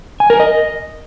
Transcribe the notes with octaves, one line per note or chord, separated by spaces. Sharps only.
G#5
A#4
D#5